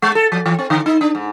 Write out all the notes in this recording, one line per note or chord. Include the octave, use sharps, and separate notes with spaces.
G#3
A4
F3
E3
C4
D3
D#4
D4
G#2